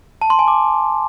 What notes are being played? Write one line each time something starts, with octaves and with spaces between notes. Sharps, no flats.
A5
C6
G#5
D6